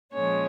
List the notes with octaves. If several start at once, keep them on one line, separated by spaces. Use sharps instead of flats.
A#2 F3 G#3 C#4 C#5